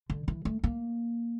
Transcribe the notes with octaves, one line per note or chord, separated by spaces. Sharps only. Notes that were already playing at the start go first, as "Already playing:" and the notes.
D3
E3
A3
A#3